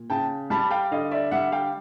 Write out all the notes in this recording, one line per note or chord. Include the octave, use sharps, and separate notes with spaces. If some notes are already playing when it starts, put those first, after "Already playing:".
Already playing: A#2
C#3 G5 A5
G3 A5 B5
F5 G5
D3 D#5 F5
D5 E5
G3 E5 F#5
F5 G5